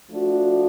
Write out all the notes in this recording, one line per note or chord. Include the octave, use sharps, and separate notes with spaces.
F3 A3 D4 F#4